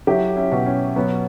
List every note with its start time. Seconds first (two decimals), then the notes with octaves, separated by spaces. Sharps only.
0.07 F#3 E4 G4
0.36 C#4 E4
0.52 B2
0.66 C#4
0.96 F#3 B3